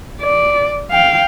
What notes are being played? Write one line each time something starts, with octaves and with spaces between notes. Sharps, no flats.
D5
F5 G5